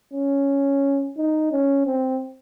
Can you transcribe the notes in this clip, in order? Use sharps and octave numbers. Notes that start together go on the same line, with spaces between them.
C#4
D#4
C#4
C4